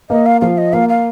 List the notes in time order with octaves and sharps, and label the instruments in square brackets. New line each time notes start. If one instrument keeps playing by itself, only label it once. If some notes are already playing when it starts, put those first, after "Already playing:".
[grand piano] A#3 [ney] D#5
[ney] F5
[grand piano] F3 [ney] F5
[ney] D#5
[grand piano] A#3 [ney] F5
[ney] F5